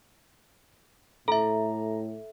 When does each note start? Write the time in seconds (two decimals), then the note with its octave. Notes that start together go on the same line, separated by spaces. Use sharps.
1.28 A2 A4 E5 A#5